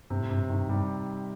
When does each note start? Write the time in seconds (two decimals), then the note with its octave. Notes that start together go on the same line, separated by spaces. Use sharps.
0.10 G2 C3
0.20 A2
0.30 G2 C3
0.49 G2 D#3
0.69 G2 G3